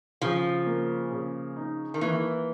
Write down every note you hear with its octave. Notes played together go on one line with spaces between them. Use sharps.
C#3 F3
A#3
C#3
D#4
D#3
E3 A#3